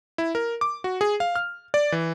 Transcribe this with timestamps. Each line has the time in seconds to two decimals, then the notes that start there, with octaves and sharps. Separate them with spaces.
0.18 E4
0.35 A#4
0.61 D6
0.84 F#4
1.01 G#4
1.20 F5
1.36 F6
1.74 D5
1.92 E3